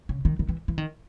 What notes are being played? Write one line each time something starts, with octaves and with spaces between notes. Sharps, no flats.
C#3
D#3
D#3
E3
E3
D#3